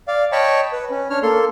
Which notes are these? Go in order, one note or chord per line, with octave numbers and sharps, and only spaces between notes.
D5 F5
C#5 D#5 G5 A5 B5 C#6
B4
C#4
D4 C#5 F6
A#3 A4 C6